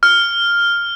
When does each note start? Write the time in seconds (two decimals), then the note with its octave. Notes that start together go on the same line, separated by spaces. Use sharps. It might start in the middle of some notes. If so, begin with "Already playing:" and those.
0.03 F6